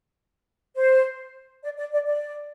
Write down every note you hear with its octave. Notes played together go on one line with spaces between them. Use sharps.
C5
D5
D5
D5
D5